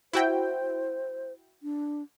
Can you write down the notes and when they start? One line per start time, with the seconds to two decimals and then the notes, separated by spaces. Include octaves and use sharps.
0.13 E4 F#4 C5 G5
1.63 D4